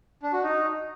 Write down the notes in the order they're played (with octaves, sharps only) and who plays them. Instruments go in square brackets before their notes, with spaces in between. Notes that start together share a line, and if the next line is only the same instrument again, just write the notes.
[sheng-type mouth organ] D4
F#4
D#4